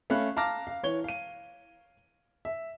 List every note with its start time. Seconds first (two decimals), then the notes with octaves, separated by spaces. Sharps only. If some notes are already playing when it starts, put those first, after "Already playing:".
0.10 A3 C#4 F5 B5 F#6
0.36 F5 A5 A#5 D6 F6 A#6
0.67 F5
0.83 E3 C#5 G7
1.04 F5 D#7
2.45 E5